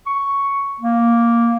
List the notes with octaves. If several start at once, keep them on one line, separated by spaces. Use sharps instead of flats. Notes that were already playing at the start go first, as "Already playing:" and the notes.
C#6
A#3